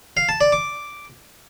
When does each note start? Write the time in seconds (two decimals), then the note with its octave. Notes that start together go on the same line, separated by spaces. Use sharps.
0.17 F5
0.29 A5
0.41 D5
0.52 D6